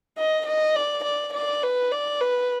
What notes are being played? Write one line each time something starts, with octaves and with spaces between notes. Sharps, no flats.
D#5
D#5
D5
D5
D5
B4
D5
B4